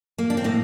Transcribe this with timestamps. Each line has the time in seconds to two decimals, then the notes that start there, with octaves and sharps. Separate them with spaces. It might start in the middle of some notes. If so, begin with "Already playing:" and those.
0.18 A#3
0.30 D4
0.37 C4
0.44 A2 A#3